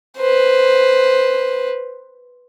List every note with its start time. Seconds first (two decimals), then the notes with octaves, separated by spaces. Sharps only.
0.17 B4 C5